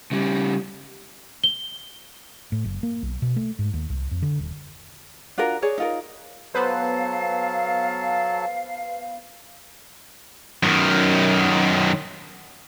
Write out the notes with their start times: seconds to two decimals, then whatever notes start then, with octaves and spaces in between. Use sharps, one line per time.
0.11 C#3 G3
1.44 G7
2.52 A2
2.64 F#1
2.83 A#3
3.03 B1
3.22 B2
3.36 A3
3.59 G#2
3.74 D#2
3.90 C2
4.11 F2
4.22 D3
4.39 D#1
5.38 D4 F4 F#4 A#4
5.62 G#4 C#5 D5
5.78 D#4 F4 A#4
6.54 F#3 B3 A4 B4 C5 F5 A5
10.63 F#2 D#3